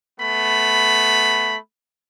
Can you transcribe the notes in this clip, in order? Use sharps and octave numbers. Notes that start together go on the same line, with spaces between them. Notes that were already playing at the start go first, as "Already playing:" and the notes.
A3 B3 B5